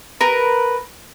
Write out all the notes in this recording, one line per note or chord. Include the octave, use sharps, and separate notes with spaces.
A#4 B4